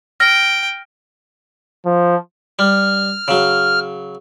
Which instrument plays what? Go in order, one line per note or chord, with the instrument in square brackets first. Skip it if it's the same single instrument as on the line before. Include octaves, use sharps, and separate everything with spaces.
[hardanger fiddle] G5 [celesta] F6 A#6
[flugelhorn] F3
[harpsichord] G3 [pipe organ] F6
[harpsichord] C#3 F#3